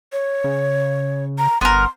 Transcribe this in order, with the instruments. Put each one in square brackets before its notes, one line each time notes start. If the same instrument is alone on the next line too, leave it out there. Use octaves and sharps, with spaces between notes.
[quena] C#5
[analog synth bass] C#3
[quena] A#5
[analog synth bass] G1 [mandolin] B3 A#4 [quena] C6